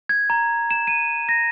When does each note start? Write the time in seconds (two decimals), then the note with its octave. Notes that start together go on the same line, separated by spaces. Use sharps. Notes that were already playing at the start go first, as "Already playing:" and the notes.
0.09 G#6
0.30 A#5
0.71 E7
0.87 D#7
1.29 A#6